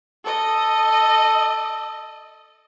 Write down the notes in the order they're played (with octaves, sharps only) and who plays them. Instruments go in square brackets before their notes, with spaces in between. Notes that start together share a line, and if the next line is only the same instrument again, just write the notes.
[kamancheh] A4 D#5